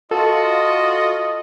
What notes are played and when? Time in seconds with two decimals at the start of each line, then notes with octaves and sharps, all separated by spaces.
0.11 F4 F#4 A4 D#5